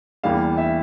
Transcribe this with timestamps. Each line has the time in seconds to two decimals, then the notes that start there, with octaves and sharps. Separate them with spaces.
0.23 E2 E3 G3 A#3 F5
0.57 E5